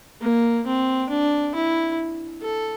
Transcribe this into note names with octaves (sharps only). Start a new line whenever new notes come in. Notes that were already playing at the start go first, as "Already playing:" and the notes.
A#3
C4
D4
E4
A4